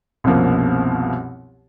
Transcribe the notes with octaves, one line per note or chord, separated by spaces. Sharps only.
C2 F#2 B2 F3 A#3